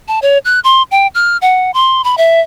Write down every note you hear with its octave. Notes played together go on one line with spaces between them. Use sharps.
A5
C#5
F#6
C6
G5
F6
F#5
C6
B5
E5